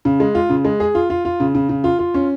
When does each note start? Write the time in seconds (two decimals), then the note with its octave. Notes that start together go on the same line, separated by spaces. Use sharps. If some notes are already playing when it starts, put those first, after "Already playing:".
0.05 C#3
0.20 G#3
0.35 F4
0.50 C#3
0.65 G#3
0.80 G#4
0.95 F4
1.10 F4
1.25 F4
1.40 C#3
1.55 C#3
1.69 C#3
1.84 F4
1.99 F4
2.14 C#4